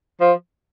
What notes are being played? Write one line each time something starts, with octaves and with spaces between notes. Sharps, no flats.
F3